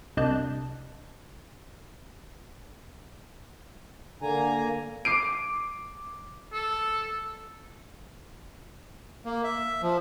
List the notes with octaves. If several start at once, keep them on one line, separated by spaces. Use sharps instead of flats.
C2 D4 D#5 A5 F#6 G6
D3 A#3 G#5 A#5
D6 C7 D7
A4
A#3
E5
F3